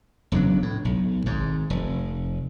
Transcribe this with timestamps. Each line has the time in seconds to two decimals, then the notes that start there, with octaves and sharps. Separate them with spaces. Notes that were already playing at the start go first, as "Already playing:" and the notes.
0.32 E1 C#3 F#3 D4
0.62 A2
0.85 B1
1.26 G#1 G#2
1.70 F1